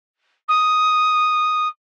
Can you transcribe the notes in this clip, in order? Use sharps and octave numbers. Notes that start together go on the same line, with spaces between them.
D#6